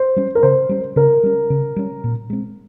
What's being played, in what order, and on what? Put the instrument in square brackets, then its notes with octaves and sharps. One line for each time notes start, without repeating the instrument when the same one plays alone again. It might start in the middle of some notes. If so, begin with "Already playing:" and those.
Already playing: [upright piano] C5
[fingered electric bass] G3 C#4
[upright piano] A#4
[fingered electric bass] C#3 [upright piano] C5
[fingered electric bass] G3 C#4
[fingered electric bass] C#3 [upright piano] A#4
[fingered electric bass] G3 C#4
C#3
G3 C#4
A#2
G#3 C4